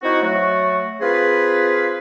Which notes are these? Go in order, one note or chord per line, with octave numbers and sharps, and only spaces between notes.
C4 D#4 E4 F#4
F#3 A3 F#4
C4 F4 G#4 B4